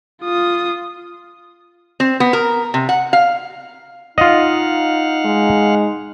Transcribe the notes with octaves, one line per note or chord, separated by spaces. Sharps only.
F4 D#6
C4
B3
A#4
C3
F#5
F5
D#4 F4 D#5 F5 F#5
G#3